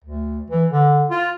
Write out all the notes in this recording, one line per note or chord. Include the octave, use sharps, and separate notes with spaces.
D2
E3
D3
F4